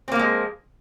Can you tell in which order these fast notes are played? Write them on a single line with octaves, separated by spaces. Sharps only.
C4 A#3 F3 G#3